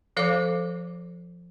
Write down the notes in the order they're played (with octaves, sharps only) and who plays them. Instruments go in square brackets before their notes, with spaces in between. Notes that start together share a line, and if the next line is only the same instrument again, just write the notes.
[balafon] F3 A4 C5 F5 D6